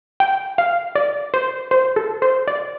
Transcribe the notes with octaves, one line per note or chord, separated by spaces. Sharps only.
G5
F5
D5
C5
C5
A4
C5
D5